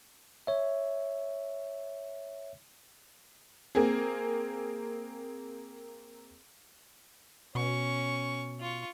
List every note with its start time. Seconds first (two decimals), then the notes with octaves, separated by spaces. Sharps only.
0.47 C#5 E5
3.75 A#3 C4 G#4
7.55 B2 C#4 C#6
8.60 F4 C#6